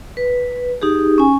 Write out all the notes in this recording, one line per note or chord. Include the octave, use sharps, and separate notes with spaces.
B4
D#4 G4 G#4
C#4 G#5